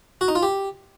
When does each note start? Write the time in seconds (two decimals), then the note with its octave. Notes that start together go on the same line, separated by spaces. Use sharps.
0.21 F#4
0.28 D#4
0.35 F4
0.43 G4